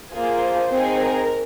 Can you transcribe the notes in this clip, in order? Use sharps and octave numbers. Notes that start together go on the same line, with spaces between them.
A#3 F4 G#4 C5
C4 D#4 G#4
A#4